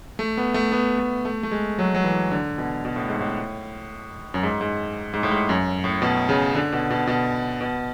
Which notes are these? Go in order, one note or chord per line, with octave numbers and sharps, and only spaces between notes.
A3
B3
A3
B3
A3
A3
A3
G#3
F#3
F#3
E3
D3
B2
B2
A2
G#2
A2
F#2
G#2
G#2
G#2
A2
G#2
F#2
A2
B2
C#3
D3
B2
B2
B2
B2